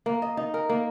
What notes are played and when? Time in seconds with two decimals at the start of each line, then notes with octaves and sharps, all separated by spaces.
0.06 A#3
0.22 D#5
0.37 D#4
0.54 A#4
0.69 A#3